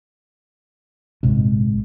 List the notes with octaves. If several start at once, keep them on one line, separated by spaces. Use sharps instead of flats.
A#1 G#2 C3 G#3